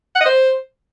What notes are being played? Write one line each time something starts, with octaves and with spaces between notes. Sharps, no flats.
F#5
D#5
C5